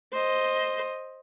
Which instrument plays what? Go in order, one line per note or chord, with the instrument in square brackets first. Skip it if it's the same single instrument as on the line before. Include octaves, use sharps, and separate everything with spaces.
[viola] C5 D#5